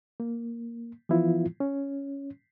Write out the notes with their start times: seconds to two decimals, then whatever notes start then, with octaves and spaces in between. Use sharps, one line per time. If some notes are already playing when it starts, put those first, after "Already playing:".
0.20 A#3
1.09 E3 F3 B3 E4 F4
1.60 C#4